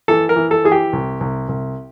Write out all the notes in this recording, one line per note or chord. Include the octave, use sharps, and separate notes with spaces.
E3 A4
A#4
E3
A4
E3 G#4
G4
C2
C2
C2